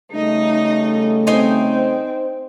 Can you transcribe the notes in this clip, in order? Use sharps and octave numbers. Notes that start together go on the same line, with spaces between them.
C#3 G3 A3 D#4 D#5
C4 D#4 C5 G#5